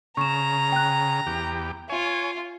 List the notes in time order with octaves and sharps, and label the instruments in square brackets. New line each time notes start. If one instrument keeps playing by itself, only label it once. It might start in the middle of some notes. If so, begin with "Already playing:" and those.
[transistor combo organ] C#3 [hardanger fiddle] A#5 [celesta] C#6 E7
[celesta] G5 F#6
[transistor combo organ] E2 G4
[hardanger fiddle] F4 [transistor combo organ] C#5 G#5